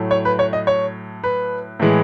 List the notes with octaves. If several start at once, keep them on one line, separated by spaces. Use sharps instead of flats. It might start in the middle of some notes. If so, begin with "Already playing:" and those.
Already playing: A2 F#3 A3
C#5
B4
C#5
D#5
C#5
B4
A2 E3 G#3